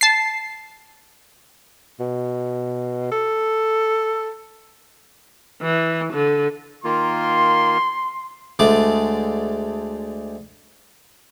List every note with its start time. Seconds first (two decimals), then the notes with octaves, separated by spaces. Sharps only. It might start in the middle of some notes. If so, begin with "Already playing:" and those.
0.01 A5 C7
2.00 B2
3.11 A4
5.62 E3
6.13 D3
6.84 D#3 A#3 F4 C6
8.59 D2 D3 G#3 A3 G#4 D6